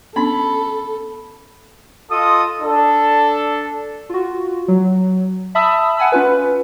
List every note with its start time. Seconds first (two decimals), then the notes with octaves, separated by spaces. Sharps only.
0.16 B3 C#4 D4 A4 B5
2.11 F4 A4 D#5 D#6
2.62 D4 A4
4.10 F4 F#4
4.68 F#3
5.55 E5 A5 B5 D#6 E6
5.97 F#5 G#5 B5 E6
6.12 C#4 F4 B4